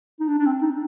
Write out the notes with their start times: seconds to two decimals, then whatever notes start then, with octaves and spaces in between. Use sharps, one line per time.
0.20 D#4
0.28 D4
0.38 D4
0.46 C4
0.62 D#4